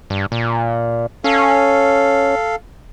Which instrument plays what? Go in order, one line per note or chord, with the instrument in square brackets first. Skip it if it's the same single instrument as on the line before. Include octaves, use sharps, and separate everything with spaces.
[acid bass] G2
A#2
[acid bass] C#4 [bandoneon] A4 F5